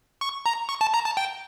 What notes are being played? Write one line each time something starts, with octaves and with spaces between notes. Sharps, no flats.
C#6
A#5
C#6
A5
A#5
A5
G5